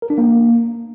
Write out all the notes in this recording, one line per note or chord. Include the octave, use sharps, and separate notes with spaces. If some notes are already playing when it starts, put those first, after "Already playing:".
A#4
D4
A#3